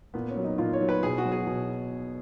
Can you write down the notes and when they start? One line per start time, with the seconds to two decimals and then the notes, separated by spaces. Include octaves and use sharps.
0.14 A#2 B3
0.30 C#4
0.37 F#3
0.44 D#4
0.58 A#2 F4
0.73 C#5
0.81 F#3
0.89 B4
1.03 B2 G#4
1.18 F#4
1.25 F#3
1.32 G#4
1.46 B2